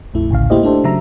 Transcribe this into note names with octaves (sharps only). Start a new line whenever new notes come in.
A#1 F2 A3 E4
A1 D2 C#3 F5
A3 A#3 E4 G4 C5 D#5
A3 D4 G4 A4 C5
C#3 F#3 E5 A#5